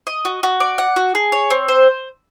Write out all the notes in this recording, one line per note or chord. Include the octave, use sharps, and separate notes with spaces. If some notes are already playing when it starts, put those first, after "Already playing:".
D#5
F#4
F#4
D5
F#5
F#4
G#4
C#5
C4
C5